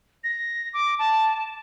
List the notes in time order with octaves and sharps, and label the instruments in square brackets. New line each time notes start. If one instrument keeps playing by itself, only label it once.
[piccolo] A#6
D6
A5